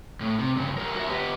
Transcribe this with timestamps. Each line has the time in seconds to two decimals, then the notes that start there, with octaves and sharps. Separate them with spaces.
0.20 A2
0.39 C3
0.55 G2 C#3
0.78 G3 A#4
0.96 F#4 E5
1.09 B3 G4